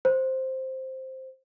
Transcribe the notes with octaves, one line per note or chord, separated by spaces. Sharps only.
C5